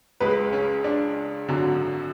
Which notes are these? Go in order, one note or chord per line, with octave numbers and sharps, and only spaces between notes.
C#2 C#3 G#3 B4
C#4
D4
G#1 F#2 D3 F#3